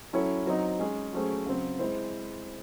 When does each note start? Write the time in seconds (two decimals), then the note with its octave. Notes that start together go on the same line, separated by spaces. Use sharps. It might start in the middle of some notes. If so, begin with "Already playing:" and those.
0.13 F#3 C#4 E4 A4 C#5
0.46 F#3 C4 D#4
0.79 G#3 C#4 G#4
1.13 F#3 A3 C#4 G#4 C5
1.46 C#3 F#3 C4
1.79 G#3 C4 E4 C5